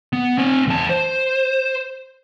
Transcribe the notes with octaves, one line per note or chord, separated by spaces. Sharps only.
B3
C4 G#5
E2 A5
C5